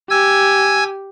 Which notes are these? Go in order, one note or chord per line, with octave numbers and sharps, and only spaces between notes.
G4 G#5 E6 G#6